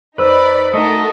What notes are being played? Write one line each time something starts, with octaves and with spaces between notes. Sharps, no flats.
F2 D#4 B4 C5 D5 B5 E6
A3 D#4 F#4 A4 A#4 D#5